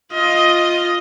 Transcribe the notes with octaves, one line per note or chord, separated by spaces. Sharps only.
F4 D#5